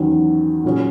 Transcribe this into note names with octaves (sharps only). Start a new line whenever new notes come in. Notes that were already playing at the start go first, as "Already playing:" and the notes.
Already playing: E2 D#3 F#3 C#4
A#2 F#3 C#4 G#4